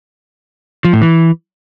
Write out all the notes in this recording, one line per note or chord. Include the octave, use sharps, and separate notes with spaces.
F3
A2
E3